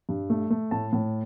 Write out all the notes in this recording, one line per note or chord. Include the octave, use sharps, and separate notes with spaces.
G2
A3
A3
A2 A5
A2